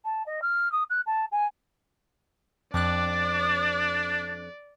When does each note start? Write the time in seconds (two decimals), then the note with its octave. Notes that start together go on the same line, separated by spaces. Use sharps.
0.05 A5
0.26 D#5
0.42 F6
0.72 D#6
0.90 F#6
1.06 A5
1.32 G#5
2.74 F2 D4 D5 D6 F#6